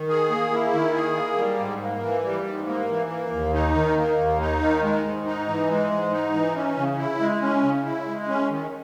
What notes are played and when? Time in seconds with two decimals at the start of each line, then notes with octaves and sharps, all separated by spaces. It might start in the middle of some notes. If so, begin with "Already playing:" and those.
Already playing: D#3
0.09 G#4
0.30 A#3
0.52 E4
0.73 D#3
0.95 G#4
1.16 A#3
1.38 G3
1.59 G#2
1.81 A#3
2.03 E3
2.24 G3
2.46 G#2
2.67 A#3
2.89 E3
3.10 A#3
3.32 D#2
3.53 D#4
3.75 D#3
3.97 A#3
4.18 D#2
4.40 D#4
4.61 D#3
4.83 G#3
5.05 G#2
5.26 D#4
5.47 E3
5.70 G#3
5.91 G#2
6.12 D#4
6.33 E3
6.55 C#4
6.77 C#3
6.98 E4
7.20 G#3
7.42 C#4
7.63 C#3
7.85 E4
8.06 G#3
8.28 C#4
8.50 D#3